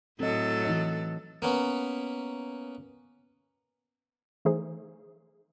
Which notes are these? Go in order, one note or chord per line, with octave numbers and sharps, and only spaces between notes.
A2 F#3 C4 A4 D#5
E3 D#4 D#5
A#3 B3 C#4
E3 A3 D#4 G#4 C5